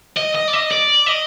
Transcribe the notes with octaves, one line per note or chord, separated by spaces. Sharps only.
D#5
D#5
D5
D#5
D5
D#5